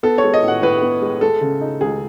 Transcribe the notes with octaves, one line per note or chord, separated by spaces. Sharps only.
B3 A4
C#5
G#3
D#5
A2
F#5
A2 B4
B3
G#3
G#3 A4
C#3
D#4
C#2 G#4